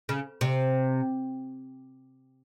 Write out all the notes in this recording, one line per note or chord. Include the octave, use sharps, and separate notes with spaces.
C#3
C3